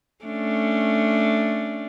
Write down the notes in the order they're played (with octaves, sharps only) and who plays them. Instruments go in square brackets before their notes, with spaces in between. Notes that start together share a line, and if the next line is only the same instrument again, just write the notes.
[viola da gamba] A3 C#4 D4